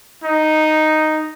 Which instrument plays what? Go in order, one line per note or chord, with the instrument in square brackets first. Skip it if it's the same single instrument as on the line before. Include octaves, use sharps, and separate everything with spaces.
[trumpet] D#4